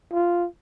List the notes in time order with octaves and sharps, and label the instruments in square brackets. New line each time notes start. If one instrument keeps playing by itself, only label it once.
[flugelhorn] F4